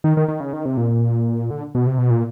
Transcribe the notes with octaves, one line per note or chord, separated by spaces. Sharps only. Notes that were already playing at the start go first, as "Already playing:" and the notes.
D#3
D#3
D#3
C#3
D#3
C3
A#2
D3
B2
C3
B2
A#2